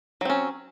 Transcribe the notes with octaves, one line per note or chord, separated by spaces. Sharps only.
F#3 C4 C#4